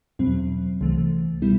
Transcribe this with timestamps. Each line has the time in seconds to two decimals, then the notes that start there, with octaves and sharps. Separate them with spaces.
0.19 E2 B2 F#3 C4
0.81 C2 C3 E3 A3
1.42 B2 G3 B3 E4